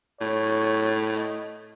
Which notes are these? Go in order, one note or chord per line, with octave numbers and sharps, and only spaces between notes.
A2 C#5
D#5